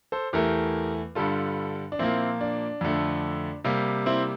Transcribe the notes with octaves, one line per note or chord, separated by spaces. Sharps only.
A4 C5
E2 E3 A3 G4 A#4
G2 D3 G3 F4 A4
D4
A#2 F3 A#3 C4 E4
D4
F2 D3 A3
C3 G3 A#3
C4 E4